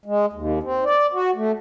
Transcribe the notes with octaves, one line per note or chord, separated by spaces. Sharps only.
G#3
D#2
C4
D5
F#4
A3